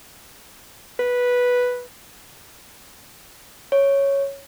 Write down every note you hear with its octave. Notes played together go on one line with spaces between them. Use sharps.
B4
C#5